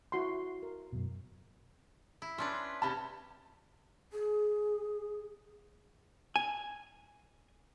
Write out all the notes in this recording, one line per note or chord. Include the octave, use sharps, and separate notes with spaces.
E4 F#4 C6
A#4
F#2 B2
E4
C#4 D4 B4 C6
C3 C#4 A5 B5
G#4
G#5